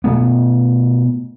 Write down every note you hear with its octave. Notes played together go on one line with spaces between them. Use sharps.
B2 A3 B3